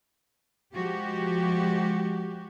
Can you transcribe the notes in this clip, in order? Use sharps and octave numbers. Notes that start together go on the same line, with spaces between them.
F3 G#3 F#4 G4